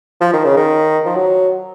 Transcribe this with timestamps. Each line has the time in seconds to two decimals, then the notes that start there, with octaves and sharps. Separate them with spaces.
0.21 F3
0.33 D#3
0.45 C#3
0.57 D#3
1.06 F3
1.16 F#3